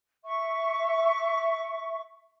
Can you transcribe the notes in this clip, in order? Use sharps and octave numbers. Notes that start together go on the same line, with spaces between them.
E5 C#6